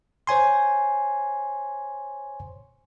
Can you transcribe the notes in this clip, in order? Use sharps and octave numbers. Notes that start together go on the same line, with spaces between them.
C5 C#5 G#5 C6